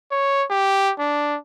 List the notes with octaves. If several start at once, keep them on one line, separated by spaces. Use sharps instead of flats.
C#5
G4
D4